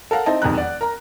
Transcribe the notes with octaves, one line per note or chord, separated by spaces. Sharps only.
A4 A#4 F5 F#5
C4 D#4 E4 D#5 A5
E1 F2 D#3 G3 A#5 F#6
D5 F#5
A#4 A#5